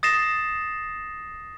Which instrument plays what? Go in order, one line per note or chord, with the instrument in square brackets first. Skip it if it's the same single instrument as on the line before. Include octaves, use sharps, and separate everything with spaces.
[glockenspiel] D#6 A6 A#6 C7 E7